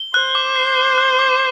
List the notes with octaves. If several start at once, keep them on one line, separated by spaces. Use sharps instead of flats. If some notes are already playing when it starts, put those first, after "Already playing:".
Already playing: G7
C5 F#6
D6
C7
G7
F#6
D6